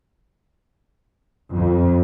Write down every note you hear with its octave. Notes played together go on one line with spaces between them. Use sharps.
F2